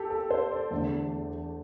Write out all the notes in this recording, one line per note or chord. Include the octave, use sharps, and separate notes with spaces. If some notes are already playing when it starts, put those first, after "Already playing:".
Already playing: G4 A4
A4
C5
D5
E2 D3 A3